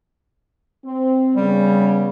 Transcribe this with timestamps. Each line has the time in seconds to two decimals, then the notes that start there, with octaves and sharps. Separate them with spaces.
0.84 C4
1.36 C#3 G3 B3